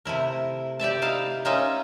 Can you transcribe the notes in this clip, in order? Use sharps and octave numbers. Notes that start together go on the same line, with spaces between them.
C3 A3 E4 A#4
G4 D5 E5 A5
D#4 E4 F5 A5
A#3 C#4 D#4 F4 D#5 E5